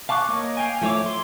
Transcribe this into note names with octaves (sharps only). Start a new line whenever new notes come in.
F5 A5 C#6 D6 F#6
A#3 A#4 C#5 D#5
F5 G5 G#5
F3 A3 E4 C#5 D6
C6